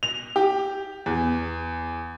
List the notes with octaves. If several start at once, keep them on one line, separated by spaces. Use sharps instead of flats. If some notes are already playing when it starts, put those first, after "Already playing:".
F7
G4
E2